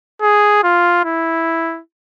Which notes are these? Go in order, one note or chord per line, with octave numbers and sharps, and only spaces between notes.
G#4
F4
E4